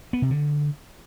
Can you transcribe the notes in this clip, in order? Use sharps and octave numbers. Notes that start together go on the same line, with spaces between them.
B3
C3
D3